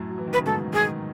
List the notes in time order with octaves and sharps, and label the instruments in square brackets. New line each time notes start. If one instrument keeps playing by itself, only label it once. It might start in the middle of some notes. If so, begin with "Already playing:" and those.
Already playing: [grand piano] F#2 A2
F#3
E3
D#3
[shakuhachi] B4
[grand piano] C#3
[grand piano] G#2 B2 [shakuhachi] A4
[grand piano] B2 D#3 [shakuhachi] G#4